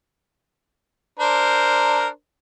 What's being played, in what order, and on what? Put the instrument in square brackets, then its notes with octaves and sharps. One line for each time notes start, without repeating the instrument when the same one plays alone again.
[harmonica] D4 A#4 C5